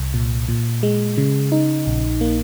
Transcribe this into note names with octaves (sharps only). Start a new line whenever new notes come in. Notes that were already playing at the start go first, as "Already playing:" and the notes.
Already playing: C2
A#2
A#2
G#3
C#3
D#4
A#1
A#3